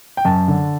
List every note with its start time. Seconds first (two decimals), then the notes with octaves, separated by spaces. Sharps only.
0.17 G5
0.25 F#2 A5
0.48 D3